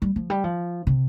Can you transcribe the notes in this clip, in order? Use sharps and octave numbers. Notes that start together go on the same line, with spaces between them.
G3
F3
G3
F3
C3